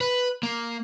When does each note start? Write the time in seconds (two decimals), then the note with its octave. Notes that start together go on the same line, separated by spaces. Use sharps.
0.01 B4
0.43 A#3